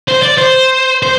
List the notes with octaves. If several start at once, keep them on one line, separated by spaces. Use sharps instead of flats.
C5
D5
C5
C5